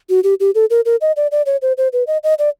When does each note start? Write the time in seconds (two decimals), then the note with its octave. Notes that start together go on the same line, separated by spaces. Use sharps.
0.10 F#4
0.24 G4
0.40 G4
0.55 A4
0.70 A#4
0.85 A#4
1.01 D#5
1.17 D5
1.32 D5
1.46 C#5
1.62 C5
1.77 C5
1.93 B4
2.07 D#5
2.23 D#5
2.39 D5